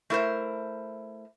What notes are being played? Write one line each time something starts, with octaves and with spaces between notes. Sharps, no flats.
A3 E4 A#4 C5